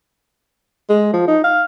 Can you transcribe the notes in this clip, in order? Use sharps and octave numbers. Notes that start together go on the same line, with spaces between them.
G#3
F3
D#4
F5